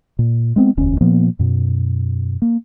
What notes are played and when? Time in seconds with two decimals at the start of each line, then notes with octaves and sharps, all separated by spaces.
0.19 A#2
0.56 G#3 B3 C4
0.77 E1 D2 C#4
1.01 A#2 F3 A#3 B3
1.39 F#2 B2
2.42 A#3